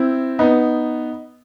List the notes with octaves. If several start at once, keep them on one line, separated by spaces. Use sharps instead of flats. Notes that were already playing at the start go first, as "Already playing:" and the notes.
Already playing: C4 E4
B3 D#4